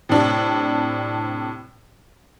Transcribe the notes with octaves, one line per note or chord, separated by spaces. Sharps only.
A2 C3 D4